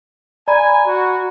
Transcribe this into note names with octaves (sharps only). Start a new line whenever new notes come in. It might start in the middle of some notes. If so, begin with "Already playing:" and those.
D5 G#5 A#5 B5
F#4